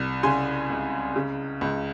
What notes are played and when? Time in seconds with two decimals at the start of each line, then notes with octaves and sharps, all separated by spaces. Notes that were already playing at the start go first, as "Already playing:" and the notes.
Already playing: C2
0.23 C#3 G#5 C6
0.70 C#2
1.16 C#3
1.61 C#2